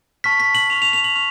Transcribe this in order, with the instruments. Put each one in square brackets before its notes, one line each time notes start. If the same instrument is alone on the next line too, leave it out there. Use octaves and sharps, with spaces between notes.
[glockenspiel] A5 C#6 F6 B6
B6
F#7
A5 C#6 F6 F7
F7
F7
F#7
C#6 F6 F7